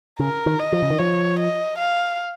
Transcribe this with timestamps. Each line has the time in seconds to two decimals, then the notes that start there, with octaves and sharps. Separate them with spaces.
0.19 C#3 A#4
0.46 D#3
0.59 D#5
0.72 F3
0.82 C#3
0.90 D#3
0.99 F3 C#5
1.39 D#5
1.78 F5